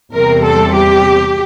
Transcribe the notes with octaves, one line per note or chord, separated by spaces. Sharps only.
E2 C3 G3 C4 A#4
A4
G4